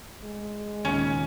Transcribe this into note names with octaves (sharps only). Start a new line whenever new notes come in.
G#3
D#2 A#2 C#3 C#4